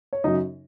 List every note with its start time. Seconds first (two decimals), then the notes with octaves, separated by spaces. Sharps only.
0.13 C#5
0.24 F#2 C#3 F#3 D#4 D#5